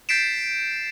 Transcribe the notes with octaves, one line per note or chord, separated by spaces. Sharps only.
G6 A6 B6 C7 D7 E7